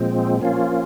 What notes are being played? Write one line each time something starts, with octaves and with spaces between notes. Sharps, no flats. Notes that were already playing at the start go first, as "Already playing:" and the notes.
Already playing: A#2 F3 G#3 C4
F3 A#3 C#4 F4